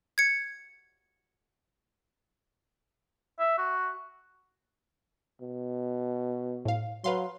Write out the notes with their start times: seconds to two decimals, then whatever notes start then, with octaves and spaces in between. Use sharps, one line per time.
0.18 G#6 C#7
3.40 E5
3.58 F#4
5.42 B2
6.65 A2 F5
7.04 F#3 B4 F5 C6